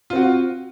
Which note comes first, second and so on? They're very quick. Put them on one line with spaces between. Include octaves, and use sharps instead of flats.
F4 C4 F#4